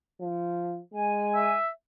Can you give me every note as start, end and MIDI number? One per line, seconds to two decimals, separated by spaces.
0.21 0.80 53
0.94 1.56 56
0.94 1.54 80
1.35 1.69 76